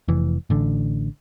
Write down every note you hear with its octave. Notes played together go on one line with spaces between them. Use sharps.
F1 E3
A1 D3